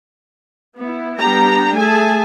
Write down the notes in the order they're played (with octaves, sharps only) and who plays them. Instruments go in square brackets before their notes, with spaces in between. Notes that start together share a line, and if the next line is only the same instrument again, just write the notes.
[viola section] B3 E4
G3 B3 D4 G4 G5 A#5
A3 G#4 E5 G#5 A5